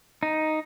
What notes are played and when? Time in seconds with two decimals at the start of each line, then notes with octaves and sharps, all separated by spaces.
0.23 D#4